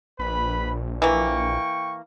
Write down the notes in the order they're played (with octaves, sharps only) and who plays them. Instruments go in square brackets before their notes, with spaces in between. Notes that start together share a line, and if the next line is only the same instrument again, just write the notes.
[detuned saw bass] A#1 [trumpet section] B4 B5
[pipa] E3 A#3 [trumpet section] G5 C#6